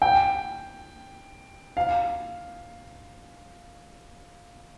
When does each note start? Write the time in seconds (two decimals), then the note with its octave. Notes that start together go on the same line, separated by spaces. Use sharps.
0.02 G5
1.77 F5